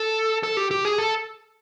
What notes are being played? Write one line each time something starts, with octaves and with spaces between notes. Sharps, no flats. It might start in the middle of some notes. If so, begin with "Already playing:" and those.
Already playing: A4
A4
G4
G4
G#4
A4